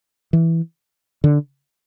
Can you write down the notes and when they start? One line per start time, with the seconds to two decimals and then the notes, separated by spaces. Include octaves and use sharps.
0.33 E3
1.24 D3